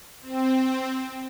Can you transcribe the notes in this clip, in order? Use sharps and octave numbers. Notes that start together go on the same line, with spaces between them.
C4